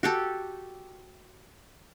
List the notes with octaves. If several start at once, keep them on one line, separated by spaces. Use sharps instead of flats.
F#4 G4 A4